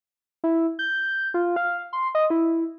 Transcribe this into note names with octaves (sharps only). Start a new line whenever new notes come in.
E4
G6
F4
F5
C6
D#5
E4